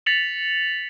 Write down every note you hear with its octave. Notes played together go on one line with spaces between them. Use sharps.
A6 B6 C#7 F7 F#7